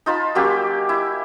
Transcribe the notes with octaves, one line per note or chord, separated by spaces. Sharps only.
D#4 F4 A5 B5
F#3 A#3 C#4 G4
E4